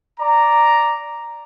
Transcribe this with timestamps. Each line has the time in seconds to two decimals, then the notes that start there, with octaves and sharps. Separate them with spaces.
0.19 D5 A#5